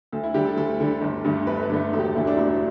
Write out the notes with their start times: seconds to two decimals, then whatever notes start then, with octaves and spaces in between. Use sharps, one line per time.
0.12 D2 A4
0.24 E4
0.34 D3 G3 G4
0.45 A4
0.56 D2 A4
0.80 D3 G3
1.02 G1
1.24 G2 D3 A3
1.47 G1 B4
1.63 B4
1.69 G2 D3 A3 A4
1.93 E1 A4
1.99 G4
2.04 A4
2.15 D2 D3 A3 E4
2.27 D4
2.37 E1 E4
2.49 D4